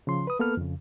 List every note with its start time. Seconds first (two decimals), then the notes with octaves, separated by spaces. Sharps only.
0.07 C#3 F3 C6
0.27 B4 D#6
0.39 A#3 B3 A4 B4 F6
0.57 F2 C#3